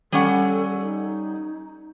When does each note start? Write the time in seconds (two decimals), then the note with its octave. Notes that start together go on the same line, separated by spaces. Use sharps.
0.12 G3 C#4 A4 F#5
0.80 D#4